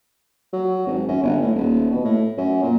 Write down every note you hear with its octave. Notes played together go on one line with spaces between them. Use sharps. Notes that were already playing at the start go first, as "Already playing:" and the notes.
F#3
G#1
F#2
G1
A2
D#1
B2
A2
F#2
A#2